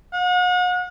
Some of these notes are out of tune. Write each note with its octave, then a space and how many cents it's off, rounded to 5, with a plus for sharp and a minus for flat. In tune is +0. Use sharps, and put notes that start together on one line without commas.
F#5 -40